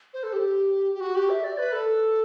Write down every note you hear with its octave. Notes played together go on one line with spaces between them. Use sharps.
C5
A4
G4
G4
F#4
G4
E5
D5
B4
A4